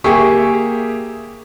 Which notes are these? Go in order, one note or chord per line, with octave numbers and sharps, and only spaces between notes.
A#3 G4 G#4 E5 C#6